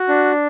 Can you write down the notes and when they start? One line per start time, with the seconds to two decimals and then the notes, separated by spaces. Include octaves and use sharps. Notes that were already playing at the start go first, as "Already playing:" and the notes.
Already playing: F#4
0.09 D4